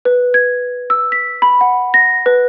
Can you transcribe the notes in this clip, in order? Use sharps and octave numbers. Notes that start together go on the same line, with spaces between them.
B4
G#6
E6
B6
B5
F#5
A#6
B4